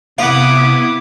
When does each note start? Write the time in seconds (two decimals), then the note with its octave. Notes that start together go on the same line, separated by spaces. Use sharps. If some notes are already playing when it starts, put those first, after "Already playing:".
0.18 C3 B3 E4 F5 F#5 D6 D#6